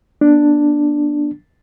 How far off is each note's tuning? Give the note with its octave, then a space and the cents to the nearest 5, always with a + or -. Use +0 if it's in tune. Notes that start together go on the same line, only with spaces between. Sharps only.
B3 -40 D4 +5